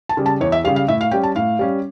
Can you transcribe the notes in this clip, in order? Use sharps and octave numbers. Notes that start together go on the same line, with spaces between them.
A5
C#3 G3
A5
E2 C#5
E5
C#3 G3 F5
F5
A2 E5
F5
G3 C#4 G5
A5
A2 F5
G3 C#4